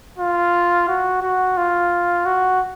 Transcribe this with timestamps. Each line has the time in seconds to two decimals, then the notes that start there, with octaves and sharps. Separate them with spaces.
0.18 F4
0.88 F#4
1.22 F#4
1.57 F4
2.26 F#4